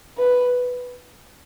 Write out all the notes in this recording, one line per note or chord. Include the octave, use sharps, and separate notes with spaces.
B4